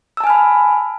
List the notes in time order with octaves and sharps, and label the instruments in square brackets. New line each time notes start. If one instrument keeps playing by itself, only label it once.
[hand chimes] E6
A5
G#5
F6
B5